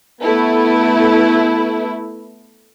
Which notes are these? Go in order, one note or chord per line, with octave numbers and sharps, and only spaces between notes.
A3 B3 E4